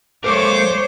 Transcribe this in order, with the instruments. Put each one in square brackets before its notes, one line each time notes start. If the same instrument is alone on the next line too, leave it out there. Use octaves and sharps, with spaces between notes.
[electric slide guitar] G#3 A4 A#4 [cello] C5 C#5 [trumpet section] D6